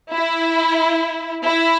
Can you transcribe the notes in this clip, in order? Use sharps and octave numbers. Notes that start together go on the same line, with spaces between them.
E4
E4